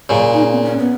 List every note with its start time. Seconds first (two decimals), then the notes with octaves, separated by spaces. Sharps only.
0.09 A#2 C#3
0.33 D#4
0.43 C#4
0.53 B3
0.63 C#4
0.78 B3